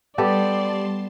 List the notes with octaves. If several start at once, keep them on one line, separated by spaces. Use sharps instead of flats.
G3 B3 G4 A4 D5 A5 C6